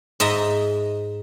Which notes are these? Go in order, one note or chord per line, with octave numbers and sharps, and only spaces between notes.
G#2 D#5 E5 A#5